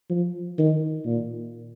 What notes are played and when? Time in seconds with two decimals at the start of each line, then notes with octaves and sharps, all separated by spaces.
0.10 F3
0.58 D#3
1.06 A#2